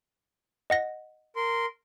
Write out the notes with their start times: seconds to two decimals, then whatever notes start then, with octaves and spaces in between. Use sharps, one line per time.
0.70 D#5 F#5 A#6
1.36 A#4 C6